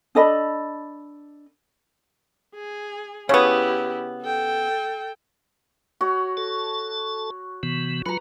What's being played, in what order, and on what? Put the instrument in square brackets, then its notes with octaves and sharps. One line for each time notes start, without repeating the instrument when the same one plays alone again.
[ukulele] D4 A4 D#5 B5
[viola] G#4
[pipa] C#3 B3 [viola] E4 G4 [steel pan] C#5 C#6 D#6
[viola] A4 G5
[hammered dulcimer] F#4 C#5
[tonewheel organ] A4 A5
C3 E3 B3
[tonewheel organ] F#3 F4 [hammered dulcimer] B4 A#5